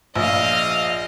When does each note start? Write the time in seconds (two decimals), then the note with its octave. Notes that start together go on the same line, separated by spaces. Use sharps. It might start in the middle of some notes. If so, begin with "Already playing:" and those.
0.16 A#1 D#5 F5